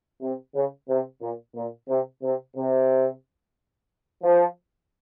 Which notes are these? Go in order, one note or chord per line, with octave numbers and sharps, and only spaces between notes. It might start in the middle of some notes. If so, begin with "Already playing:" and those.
C3
C#3
C3
A#2
A#2
C3
C3
C3
F3